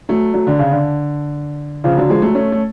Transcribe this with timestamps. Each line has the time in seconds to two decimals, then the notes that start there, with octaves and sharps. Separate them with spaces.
0.09 F#3 A3
0.34 F#3 A3
0.47 D3
0.59 C#3
0.71 D3
1.84 C#3 F3
1.97 D3 F#3
2.10 F3 G#3
2.22 F#3 A3
2.35 A3 C#4
2.52 A3